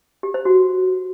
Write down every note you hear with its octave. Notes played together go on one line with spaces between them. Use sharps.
G4
C5
F#4